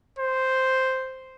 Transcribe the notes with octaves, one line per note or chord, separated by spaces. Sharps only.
C5